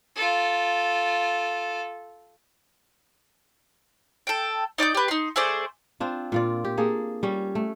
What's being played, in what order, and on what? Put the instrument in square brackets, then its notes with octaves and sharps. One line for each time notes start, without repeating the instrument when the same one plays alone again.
[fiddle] F4 A4
[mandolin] A4 G5
D#4 D5 C#6 G6
G4 B4
D#4 C6
A3 G#4 C5 D5
[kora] C4 D4 F4
A#2 F4 D5
G4
A#3 G#4 A4
G3 C#4
A3